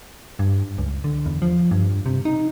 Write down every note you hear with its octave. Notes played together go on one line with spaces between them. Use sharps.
G2
C#2
D3
E2
F3
G2
C3
D#4